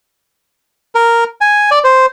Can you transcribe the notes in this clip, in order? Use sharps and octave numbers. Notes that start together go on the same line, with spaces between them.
A#4
G#5
D5
C5